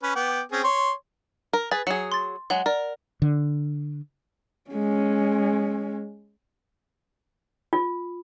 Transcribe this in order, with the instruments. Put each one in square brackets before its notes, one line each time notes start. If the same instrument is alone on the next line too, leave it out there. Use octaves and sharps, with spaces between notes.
[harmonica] C#4 B4
B3 G5 D6
C4 C#4 G#4
C#5 C6
[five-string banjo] A#4
[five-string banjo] G#4 B4 [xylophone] A6
[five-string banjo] F#3 G#4 [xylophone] C#7
[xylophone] C6 A6
[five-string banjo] F#3 G#3 [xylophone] F#5
[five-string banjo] A#4 [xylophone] D5
[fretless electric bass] D3
[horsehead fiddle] G#3 C#4
[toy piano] F4